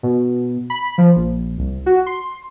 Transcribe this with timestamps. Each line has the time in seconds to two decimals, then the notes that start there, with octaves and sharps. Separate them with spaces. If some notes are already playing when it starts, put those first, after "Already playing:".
0.03 B2
0.70 B5
0.98 F3
1.16 A#1
1.58 C2
1.86 F#4
2.06 C6